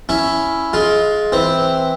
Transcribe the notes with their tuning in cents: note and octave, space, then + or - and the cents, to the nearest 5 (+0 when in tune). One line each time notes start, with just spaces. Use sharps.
C#4 +0 E4 +0
G#3 +20 F4 +0
E3 -5 C4 +0